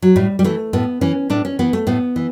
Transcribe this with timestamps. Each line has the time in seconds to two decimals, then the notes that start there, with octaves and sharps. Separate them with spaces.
0.02 F#3
0.16 A2 G3
0.39 G3
0.44 E3 A3
0.73 A2 B3
1.01 E3 C#4
1.30 A2 D4
1.45 C#4
1.59 E3 B3
1.73 A3
1.87 A2 B3
2.16 E3